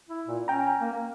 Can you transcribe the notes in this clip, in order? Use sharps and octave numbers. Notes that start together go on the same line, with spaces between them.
E4
A#2
C#4 G5 A#5
A#3
A#3